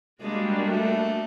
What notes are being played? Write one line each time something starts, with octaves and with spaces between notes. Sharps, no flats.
G3 G#3 A#3 D4 F#4
A3